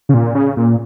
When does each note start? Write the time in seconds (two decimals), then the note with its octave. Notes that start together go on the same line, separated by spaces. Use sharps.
0.09 C#3
0.14 A#2
0.35 C#3
0.57 A#2